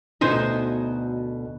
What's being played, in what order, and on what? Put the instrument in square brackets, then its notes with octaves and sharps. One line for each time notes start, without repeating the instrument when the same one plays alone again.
[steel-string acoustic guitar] D2 B2 [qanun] D#4 C5 G#5